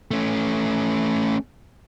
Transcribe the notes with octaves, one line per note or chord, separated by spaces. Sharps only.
A3 C#4